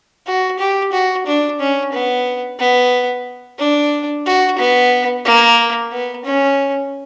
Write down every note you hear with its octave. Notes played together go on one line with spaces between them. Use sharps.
F#4
G4
F#4
D4
C#4
B3
B3
D4
F#4
B3
A#3
B3
C#4